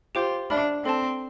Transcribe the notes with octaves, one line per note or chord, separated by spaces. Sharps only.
F4 G4 C5 G5 D6 G6
D4 E5 B5 F6
C4 A4 D5 A5